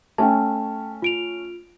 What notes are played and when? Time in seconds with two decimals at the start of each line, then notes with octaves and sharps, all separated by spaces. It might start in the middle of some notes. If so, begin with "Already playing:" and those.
0.18 A3 C#4 G5 A5
1.02 F4 D7 F7